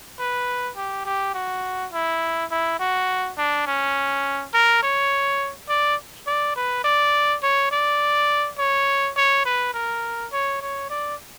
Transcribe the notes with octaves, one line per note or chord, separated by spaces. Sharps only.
B4
G4
G4
F#4
E4
E4
F#4
D4
C#4
A#4
C#5
D5
D5
B4
D5
C#5
D5
C#5
C#5
B4
A#4
C#5
C#5
D5